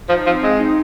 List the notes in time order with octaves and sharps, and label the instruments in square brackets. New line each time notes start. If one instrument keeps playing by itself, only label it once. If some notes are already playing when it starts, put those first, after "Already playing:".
[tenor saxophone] F3 [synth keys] D#4
[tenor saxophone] F3 [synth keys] C4
[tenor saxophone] G#3 [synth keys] C4
[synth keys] D#4